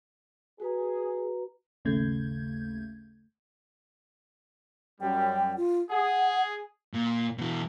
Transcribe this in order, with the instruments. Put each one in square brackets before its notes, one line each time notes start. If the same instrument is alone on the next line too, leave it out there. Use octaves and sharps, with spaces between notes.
[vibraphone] F#4 B4 A#5 [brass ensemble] G#4
[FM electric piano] G#1 D#2 C#3 A3 G6 G#6
[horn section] F#2 G3 [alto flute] G5
[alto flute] F4
[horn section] G#4 [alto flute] F#5
[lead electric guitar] A#2
B2 E3